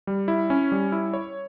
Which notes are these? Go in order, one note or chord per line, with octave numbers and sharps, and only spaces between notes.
G3
E4
C#4
G3
E4
C#5